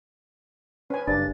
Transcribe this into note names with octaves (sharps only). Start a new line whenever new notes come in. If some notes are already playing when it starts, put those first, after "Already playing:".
C4 C#4 B4 G#5
F#1 G2 D4 A6